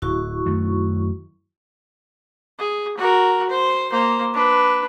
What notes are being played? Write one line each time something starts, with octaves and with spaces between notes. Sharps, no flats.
D1 E4 F#4 C#6
F#2 D#3 A3
G#4
F#4 A#4
C5
A#3 C5
D4 B4